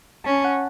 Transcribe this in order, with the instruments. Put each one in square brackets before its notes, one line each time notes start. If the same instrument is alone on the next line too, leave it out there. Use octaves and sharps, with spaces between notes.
[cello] C#4 [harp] A5
[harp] F#5